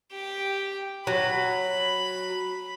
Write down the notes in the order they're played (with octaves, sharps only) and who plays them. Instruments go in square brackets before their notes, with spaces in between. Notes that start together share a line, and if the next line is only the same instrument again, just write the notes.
[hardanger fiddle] G4 G5
[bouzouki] F#3 [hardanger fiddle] B5